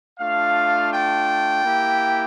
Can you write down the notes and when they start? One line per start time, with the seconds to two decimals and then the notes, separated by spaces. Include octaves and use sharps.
0.19 A3 D4 F4 F5
0.92 G5
1.64 A#3 E4 G4